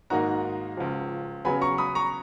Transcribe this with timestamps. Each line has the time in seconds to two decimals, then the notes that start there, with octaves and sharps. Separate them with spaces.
0.10 G#2 D#3 A#3 D#4 F#4 F#5 A#5
0.77 C#2 C#3 F3
1.45 C#3 F#3 B3 G#5 B5
1.61 A#5 C#6
1.78 B5 D#6
1.95 A#5 C#6